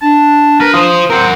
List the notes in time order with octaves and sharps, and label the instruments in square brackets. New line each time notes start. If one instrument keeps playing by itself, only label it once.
[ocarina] D4 [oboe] A5
[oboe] A#4 [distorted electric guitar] B4
[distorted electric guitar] F4 C5 [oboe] D#6
[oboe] C4 [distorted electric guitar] A#4 F#5